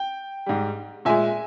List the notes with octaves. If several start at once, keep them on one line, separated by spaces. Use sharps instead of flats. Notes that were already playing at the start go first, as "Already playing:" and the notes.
Already playing: G5
G#2 G3
A#2 G#3 E5 G#5